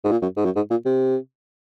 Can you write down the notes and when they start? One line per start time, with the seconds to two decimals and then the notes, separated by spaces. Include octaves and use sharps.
0.04 G#2
0.12 A#2
0.22 F#2
0.37 G#2
0.45 F#2
0.56 G#2
0.71 A#2
0.85 C3